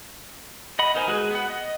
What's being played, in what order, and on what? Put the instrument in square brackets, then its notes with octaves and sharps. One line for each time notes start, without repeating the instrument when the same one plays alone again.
[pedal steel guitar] D#5 F#5 B5
B3 D#4 A#4 C5 G#5
G#3 F#4 G#4 B4
B3 F#5
D#5